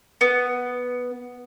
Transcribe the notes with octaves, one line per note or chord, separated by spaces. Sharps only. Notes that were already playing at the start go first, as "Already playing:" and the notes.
B3